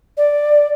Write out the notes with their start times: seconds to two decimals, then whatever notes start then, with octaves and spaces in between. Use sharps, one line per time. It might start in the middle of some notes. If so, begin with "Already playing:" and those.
0.17 D5